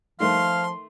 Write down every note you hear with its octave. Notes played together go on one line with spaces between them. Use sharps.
D#3 F3 A3 F5 C6